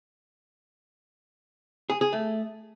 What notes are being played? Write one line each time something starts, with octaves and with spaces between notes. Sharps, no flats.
G#4
G#4
A3